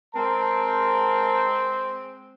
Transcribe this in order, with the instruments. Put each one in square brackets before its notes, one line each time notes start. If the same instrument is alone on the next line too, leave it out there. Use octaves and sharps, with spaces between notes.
[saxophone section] G#3 C4 [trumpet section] A#4 A5